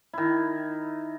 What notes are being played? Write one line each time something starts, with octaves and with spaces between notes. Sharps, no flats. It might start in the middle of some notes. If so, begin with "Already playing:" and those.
D#3 E4